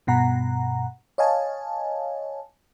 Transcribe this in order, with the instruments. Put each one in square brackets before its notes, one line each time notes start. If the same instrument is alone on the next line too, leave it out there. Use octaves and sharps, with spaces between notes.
[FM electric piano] G2 B2 F#5 A#5
C#5 D#5 F5 G#5 A5